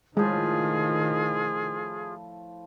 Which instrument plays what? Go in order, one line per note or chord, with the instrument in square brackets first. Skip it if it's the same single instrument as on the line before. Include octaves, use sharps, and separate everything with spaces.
[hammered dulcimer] A2 F3 [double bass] D#3 [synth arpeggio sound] G#3 [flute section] F4 G#4